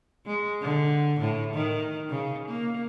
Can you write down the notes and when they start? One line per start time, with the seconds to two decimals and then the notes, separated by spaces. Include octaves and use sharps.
0.26 G#3
0.62 D3
1.20 A2
1.54 D#3
2.10 C#3
2.48 A#3